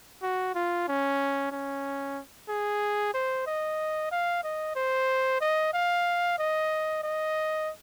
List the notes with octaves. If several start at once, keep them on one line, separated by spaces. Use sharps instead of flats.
F#4
F4
C#4
C#4
G#4
C5
D#5
F5
D#5
C5
D#5
F5
D#5
D#5